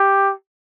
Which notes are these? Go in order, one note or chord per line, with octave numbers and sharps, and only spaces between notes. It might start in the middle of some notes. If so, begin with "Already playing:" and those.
Already playing: G4